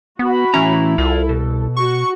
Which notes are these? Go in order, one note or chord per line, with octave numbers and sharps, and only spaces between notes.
B3 F#4 B5
A2 E3 C#4 E4 A#5
C2 F4 A4
B2
F#4 C#6